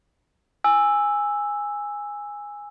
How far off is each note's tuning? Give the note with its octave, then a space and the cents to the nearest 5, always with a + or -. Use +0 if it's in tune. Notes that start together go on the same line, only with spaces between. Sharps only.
G#5 -10 E6 +0